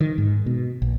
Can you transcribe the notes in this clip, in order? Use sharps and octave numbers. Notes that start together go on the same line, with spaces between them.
D#3
G#2
B2
A#1